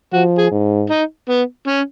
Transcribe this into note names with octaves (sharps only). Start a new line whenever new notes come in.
F3 F#4
G#4
G#2
D#4
B3
C#4